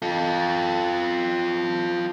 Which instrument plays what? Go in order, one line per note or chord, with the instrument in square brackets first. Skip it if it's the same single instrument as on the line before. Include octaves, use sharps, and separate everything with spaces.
[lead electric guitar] F4 A4